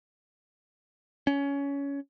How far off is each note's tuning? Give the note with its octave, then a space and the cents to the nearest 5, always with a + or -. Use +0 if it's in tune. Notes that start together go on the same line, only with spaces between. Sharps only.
C#4 +20